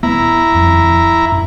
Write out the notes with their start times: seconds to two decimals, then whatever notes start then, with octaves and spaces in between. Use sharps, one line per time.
0.03 D#1 B3 E4 A#5
0.54 D#1 F2
1.32 F#2